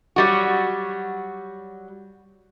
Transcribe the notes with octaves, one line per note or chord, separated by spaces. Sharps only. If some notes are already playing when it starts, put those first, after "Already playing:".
F#3 G3 F#4